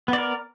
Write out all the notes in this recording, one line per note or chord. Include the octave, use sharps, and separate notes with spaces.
B3 A#4 D5